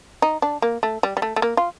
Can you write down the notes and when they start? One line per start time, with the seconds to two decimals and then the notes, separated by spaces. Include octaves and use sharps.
0.22 D#4
0.42 D4
0.62 A#3
0.83 A3
1.03 G3
1.17 G3
1.22 A3
1.36 A3
1.42 A#3
1.57 F4